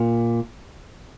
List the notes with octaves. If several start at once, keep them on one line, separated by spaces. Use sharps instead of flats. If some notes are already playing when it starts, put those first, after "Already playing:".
Already playing: A#2